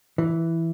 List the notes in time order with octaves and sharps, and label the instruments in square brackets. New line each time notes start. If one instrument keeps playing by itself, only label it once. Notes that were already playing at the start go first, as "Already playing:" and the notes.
[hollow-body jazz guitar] E3